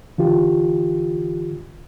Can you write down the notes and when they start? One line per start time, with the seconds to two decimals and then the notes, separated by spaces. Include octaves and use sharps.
0.18 D3 E3 F4 G4